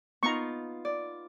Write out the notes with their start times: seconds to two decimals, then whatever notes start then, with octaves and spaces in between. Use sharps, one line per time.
0.23 B3 D#4 F4 A#5 C#6
0.85 D5